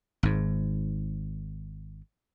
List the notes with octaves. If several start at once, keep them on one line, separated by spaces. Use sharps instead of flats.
G#1 G#2